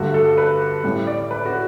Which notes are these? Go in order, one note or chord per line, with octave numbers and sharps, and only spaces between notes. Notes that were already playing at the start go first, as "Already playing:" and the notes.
Already playing: G2 D3 A3 F#4
A4
B4
A2 G3
D5
B4
F#4